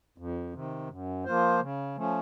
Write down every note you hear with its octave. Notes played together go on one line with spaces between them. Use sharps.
F2
C3 D#3
F#2
F3 A#3 F4 C5
C#3
F3 A3 C#4